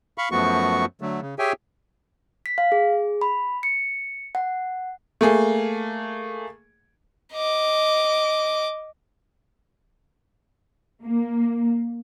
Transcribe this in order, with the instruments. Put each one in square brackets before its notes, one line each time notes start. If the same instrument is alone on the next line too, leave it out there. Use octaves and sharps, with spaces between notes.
[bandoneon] F5 B5 C#6
F#2 F3 A3 B3 F#4 C#6
D3 F#3 A3
C#3
G4 G#4 C#5 E5 G5 G#5
[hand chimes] B6
F5
G#4
B5
C#7
F#5
[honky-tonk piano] A3 A#3 G#4
[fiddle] D#5 D6
[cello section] A#3